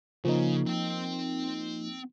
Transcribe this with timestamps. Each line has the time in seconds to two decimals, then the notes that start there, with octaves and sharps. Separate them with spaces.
0.25 C#3 F3 A#3 D#4
0.66 C4 G5